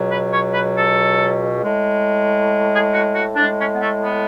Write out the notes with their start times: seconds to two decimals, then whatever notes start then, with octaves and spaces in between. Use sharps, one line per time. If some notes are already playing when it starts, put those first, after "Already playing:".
Already playing: C#2 B2 F#3
0.10 B4
0.31 C#5
0.53 B4
0.75 A4
1.62 A2 G#3
2.71 G#4
2.93 F#4
3.14 F#4
3.36 A2 G#3 D4
3.58 C#4
3.75 B3
3.80 A3
4.02 B3